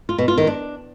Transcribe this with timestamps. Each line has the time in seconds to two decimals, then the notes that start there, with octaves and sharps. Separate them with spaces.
0.09 F4
0.18 B2
0.28 F4
0.38 D#3
0.47 D4